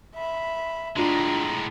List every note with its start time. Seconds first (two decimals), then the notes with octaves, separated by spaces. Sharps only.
0.16 E5 B5
0.96 A2 G#3 D4 F4 A#5